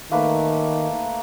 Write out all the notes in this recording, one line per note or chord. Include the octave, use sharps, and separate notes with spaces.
D#3 A3 A#3 B4